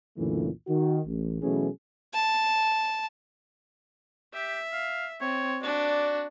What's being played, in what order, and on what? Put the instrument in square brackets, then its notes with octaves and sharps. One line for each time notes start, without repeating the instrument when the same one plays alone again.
[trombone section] C#2 F#2 A#2 D3 E3 A3
D#3 F#4
A1
B2 E3 F#3 A3 C#4 G#4
[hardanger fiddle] A5
[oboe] G4 [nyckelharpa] E5
[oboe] F5
[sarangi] C4 [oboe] C#5
[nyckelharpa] D4 [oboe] F#4 [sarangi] D5